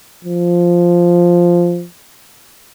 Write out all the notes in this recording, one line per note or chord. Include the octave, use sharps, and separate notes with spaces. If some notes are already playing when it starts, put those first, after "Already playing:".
F3